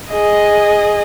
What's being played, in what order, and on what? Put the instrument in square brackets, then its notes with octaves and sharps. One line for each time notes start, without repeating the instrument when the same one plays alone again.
[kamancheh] G#4 D#5